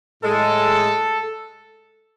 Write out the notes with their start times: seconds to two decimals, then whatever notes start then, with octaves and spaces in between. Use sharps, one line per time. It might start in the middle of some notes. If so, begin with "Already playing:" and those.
0.23 A2 G#3 A4